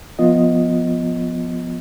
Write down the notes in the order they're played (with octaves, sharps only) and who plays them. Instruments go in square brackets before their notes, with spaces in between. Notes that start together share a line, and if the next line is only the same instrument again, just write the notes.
[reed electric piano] F3 B3 F4 D#5